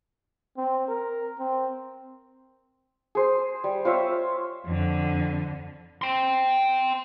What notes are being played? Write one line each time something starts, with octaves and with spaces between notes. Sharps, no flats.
C4
A#4
C4
G#4 C5
G3
F4 C5 C#5 E5
F2 D3
G5 C6